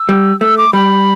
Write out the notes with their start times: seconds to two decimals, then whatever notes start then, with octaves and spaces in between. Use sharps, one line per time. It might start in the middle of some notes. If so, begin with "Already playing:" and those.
Already playing: E6
0.09 G3
0.40 A3 E6
0.58 D6
0.73 G3 B5